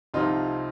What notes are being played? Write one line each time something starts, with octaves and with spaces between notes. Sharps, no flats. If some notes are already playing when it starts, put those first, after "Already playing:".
C2 C3 F3 D#4 F4